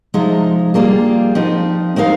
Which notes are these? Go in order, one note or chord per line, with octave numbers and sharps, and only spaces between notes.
C3 F3 G#3 D#4
G3 A#3 F4 G#4
F3 C4 D#4
G#3 C4 D#4 A#4 F5